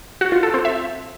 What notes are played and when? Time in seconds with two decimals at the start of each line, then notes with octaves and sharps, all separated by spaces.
0.21 F#4
0.32 F4
0.43 A4
0.54 C4
0.65 E5